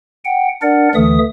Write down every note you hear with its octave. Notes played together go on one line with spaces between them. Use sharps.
F#5 G5
D4 A#4 D5 F#5
D2 D3 E3 A3 E5 D#6